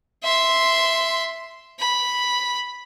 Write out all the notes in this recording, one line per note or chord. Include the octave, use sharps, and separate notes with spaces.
E5 C6
B5